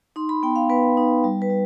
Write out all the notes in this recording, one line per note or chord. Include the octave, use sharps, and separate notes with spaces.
D#4 C6
B5
B3 G5
F5
B3 B4
D#4
G3
B4
G3